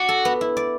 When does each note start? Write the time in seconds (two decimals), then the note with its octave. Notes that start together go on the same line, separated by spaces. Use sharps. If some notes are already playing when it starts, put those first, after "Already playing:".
Already playing: F#4 D5
0.09 A4
0.25 B3
0.41 E4
0.57 D5